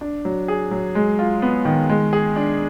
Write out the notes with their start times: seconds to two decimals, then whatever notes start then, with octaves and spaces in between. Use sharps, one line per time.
0.01 D4
0.25 F#3
0.48 G#4
0.71 F#3
0.95 G#3
1.19 F4
1.42 B3
1.65 D#3
1.89 G#3
2.13 G#4
2.36 D4